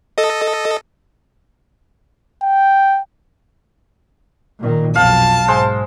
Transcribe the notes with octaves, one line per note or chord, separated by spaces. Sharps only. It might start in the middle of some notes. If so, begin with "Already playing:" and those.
A4 D#5
G5
A#2 D#3
B1 F2 F5 A5
G#2 G#3 C5 E6